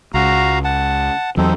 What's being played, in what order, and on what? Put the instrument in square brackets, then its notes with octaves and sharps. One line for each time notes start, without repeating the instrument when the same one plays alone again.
[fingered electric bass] C#2 [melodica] F#4 F5 A#5
[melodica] F#5 A5
[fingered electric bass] E2 F#3 [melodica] C4 D#4 A4